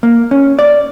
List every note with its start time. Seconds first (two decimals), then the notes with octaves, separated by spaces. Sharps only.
0.03 A#3
0.31 C#4
0.59 D5